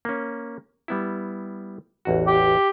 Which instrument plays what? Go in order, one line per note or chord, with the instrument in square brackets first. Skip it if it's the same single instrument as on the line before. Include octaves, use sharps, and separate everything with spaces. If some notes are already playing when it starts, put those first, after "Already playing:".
[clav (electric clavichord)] A#3 C#4
G3 B3 E4
A1 E2 F#4
[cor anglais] G4